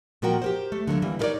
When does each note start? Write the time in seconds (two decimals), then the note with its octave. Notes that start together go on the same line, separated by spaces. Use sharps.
0.22 A#2 F3 A#3 F#4 A#4 G5
0.42 G4 A#4 C5
0.72 A3
0.87 D3 F#3 A3 A#3
1.02 E3 G3 A#3
1.19 D#4 E4 A#4 B4 C#5 D5